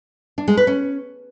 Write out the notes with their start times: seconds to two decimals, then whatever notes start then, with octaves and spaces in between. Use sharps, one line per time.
0.38 D4
0.48 G#3
0.57 B4
0.67 C#4